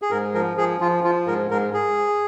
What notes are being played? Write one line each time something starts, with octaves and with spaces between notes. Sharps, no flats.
G#4
G#2 A#4
F3 A#4
F3 G#4
F3 F4
F3 F4
G#2 A#4
G#2 A#4
G#4